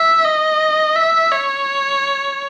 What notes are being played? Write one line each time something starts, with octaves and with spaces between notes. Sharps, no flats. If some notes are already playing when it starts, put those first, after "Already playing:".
Already playing: E5
D#5
E5
C#5